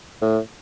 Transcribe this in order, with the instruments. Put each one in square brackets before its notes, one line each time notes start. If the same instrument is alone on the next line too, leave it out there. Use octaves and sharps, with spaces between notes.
[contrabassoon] A2